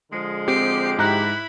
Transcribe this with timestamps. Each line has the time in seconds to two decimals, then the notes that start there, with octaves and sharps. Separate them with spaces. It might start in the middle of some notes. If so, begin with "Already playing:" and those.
0.12 D3 F3 G#3
0.48 C4 G4 C7 D7
0.98 G#2 E4 A#5 B5 F#6